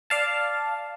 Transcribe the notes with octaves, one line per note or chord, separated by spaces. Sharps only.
D5 F5 A5